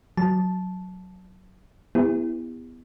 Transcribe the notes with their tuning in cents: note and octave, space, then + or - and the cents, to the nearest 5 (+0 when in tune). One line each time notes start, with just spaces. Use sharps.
F#3 +0 A5 -10
B3 +10 E4 +0 G4 +40